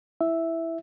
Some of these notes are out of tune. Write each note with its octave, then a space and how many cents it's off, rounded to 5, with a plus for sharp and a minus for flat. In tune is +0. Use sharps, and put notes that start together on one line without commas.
E4 +0 E5 +0